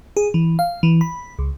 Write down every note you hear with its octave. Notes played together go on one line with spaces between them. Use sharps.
G#4
E3
F5
E3
B5
C#2